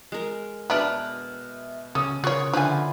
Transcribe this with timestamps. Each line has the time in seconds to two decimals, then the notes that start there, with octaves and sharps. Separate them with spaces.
0.12 G#3 A#4
0.70 B2 B3 D4 E5 A#5 B5 F6
1.95 C#3 C#4 A4 D#6
2.24 C#3 F4 F#4 A#4 C#5 C#6
2.54 D3 F3 E4 F4 B4 G#5